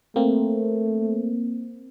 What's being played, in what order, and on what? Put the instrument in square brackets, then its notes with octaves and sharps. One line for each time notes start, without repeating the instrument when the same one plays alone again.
[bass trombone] A3 [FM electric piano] A#3 C4